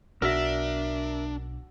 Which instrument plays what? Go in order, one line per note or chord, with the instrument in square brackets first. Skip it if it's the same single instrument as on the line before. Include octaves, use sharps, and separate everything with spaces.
[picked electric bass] B1 [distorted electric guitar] D4 [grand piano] F#4 E6 A#6 [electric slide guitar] A#4 E5